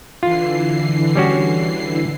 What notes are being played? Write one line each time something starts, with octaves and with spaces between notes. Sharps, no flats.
D3 E3 F4 C7
G3 C#4 F#4